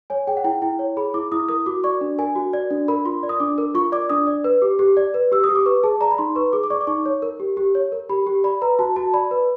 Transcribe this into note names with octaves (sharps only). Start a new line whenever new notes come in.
C#5 G#5
G#4 G5
F#5
E4 G5
E4 G5
C#5
G#4 B5
E4 D6
E4 D#6
A#4 D#6
F#4 D6
D5 C#6
D4
A#4 G#5
F#4
D5
D4
A#4 B5
F4 C6
D5
D#6
D4 D6
A#4
F4 C#6
D5 D6
D4 D#6
D5
B4
G4 D6
G4
D5
B4
G4 E6
D#6
G4
D6
B4 C#6
G#4 A5
D5 A#5
B5
D#4 C6
B4 C#6
G#4 D6
D6
D5 C#6
D6
D#4 C#6
C#5
A#4
G4
G4
C#5
A#4
G4 B5
G4
D5 B5
B4 A#5
F#4 A5
F#4 A5
D5 B5
B4